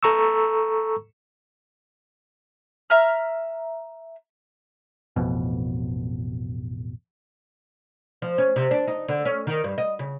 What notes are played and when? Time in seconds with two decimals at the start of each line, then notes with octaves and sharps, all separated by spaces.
0.03 A4 A#5 C#6 E6
2.90 E5 A#5 F6
5.16 A1 F2 B2
8.22 F3
8.38 C#4
8.56 C3
8.71 D4
8.87 D#4
9.08 D3
9.25 C#4
9.47 D#3
9.64 G2
9.78 D#5
9.99 C#3